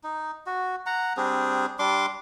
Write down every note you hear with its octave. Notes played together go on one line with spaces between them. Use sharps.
D#4
F#4
F#5 A#5
G3 C4 D4 G#4
G3 D4 C6 D6